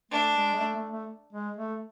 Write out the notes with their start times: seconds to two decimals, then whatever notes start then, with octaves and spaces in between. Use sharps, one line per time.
0.11 A3 D4
0.35 G#3
0.54 G#3
0.59 A3
0.76 A3
0.92 A3
1.33 G#3
1.57 A3